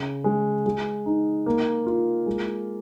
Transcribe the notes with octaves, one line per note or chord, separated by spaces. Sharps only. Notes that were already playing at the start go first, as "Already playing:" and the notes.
Already playing: C#3
G#3
G#3
D#4
A#3
F4
G#3